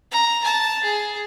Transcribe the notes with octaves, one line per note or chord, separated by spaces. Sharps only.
A#5
A5
G#4